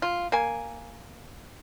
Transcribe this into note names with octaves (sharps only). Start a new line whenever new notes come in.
F4
A#3 G#5